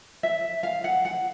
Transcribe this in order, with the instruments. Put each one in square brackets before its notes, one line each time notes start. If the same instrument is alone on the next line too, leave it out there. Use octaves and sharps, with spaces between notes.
[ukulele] E5
F5
F#5
F#5